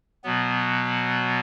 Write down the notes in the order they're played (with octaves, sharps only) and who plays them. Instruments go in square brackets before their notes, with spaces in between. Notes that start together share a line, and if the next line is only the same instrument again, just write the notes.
[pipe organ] B2 F#3 B3